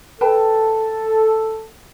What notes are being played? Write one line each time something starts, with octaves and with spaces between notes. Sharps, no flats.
A4 B4 G5 A5